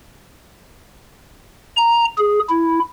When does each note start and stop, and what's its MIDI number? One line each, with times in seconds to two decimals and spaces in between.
1.77 2.05 82
2.17 2.39 68
2.49 2.79 64